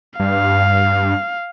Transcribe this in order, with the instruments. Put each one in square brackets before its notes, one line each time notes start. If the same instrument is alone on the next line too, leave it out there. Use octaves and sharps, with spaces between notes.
[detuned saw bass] G2 [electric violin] F5